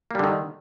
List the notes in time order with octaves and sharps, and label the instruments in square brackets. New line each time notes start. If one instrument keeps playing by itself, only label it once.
[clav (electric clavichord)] A#3
G3
D3
D#3